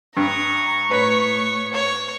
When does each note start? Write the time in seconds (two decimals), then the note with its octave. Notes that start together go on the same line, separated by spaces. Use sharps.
0.17 G2 A#5 C#6 D#6
0.91 A2 B4 C#5
1.73 C#5